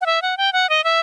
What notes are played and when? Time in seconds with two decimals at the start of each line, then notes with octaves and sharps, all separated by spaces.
0.01 F#5
0.06 E5
0.22 F#5
0.37 G5
0.53 F#5
0.70 D#5
0.84 E5